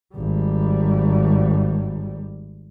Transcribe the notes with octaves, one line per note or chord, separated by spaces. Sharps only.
G#1 G3